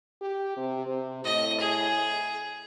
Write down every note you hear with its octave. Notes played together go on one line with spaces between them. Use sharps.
G4
C3
C3
A2 D#5
G#4